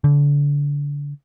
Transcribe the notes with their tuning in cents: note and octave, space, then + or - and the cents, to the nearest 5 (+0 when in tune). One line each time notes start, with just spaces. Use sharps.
D3 -30